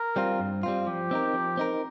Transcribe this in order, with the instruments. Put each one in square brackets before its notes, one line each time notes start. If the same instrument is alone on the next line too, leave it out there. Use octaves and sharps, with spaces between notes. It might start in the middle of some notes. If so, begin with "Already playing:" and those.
Already playing: [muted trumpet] A#4
[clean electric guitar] G3 C4 F4
G2
G3 C4 F4
[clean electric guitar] F3 [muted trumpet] G4
[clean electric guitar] C4 D#4 A#4
F3
C4 D#4 A#4